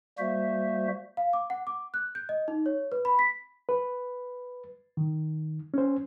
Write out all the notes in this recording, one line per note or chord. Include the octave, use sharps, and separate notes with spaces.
G3 A#3 F#4 C5 E5
F5
D6
F#5
D6
F#6
G6
D#5
D#4
C#5
B4
B5
B6
B4
D#3
C#4 C5